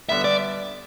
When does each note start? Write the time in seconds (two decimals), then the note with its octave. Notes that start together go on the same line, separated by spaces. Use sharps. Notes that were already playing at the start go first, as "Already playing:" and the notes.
0.09 D3 G3 B3 E5
0.24 D5